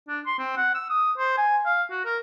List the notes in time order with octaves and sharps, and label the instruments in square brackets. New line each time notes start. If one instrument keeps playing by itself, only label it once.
[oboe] D4
C6
C4
F#5
E6
D#6
C5
G#5
F5
F#4
A#4